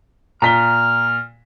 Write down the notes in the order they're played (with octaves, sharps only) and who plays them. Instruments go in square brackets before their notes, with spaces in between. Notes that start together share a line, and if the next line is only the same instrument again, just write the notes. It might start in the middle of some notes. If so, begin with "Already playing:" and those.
[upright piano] A#2 B6 G7 [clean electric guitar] A#5 [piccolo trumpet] F6